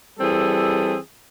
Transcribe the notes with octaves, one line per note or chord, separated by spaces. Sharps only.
E3 G3 C4 G#4 A4